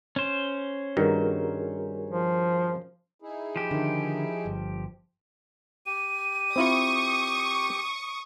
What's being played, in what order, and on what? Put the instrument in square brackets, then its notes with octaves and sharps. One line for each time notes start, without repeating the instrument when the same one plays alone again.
[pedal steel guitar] C#4 C5
[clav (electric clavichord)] G2 D#3 [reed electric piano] F#4 G#4 A#4
[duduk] F3
[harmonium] D#4 E4 G#4
[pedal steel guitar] F3 G4
[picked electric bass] D3 D#3
G1
[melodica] G4 [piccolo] D#7
[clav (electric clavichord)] C4 E4 F4 [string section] C#6 D#6